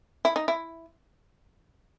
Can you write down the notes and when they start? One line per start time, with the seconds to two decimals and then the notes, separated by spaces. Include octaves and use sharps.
0.25 E4
0.36 D#4
0.48 E4